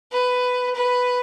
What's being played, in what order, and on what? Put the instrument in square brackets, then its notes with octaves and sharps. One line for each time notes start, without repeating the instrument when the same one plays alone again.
[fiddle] B4
B4